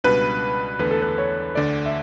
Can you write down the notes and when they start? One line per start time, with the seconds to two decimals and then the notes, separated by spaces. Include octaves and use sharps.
0.04 C#2 B2 G3 D4 B4
0.79 E2 D3 A3 B4
0.91 A4
1.02 B4
1.18 C#5
1.55 D2 D3 A3 D5
1.85 E5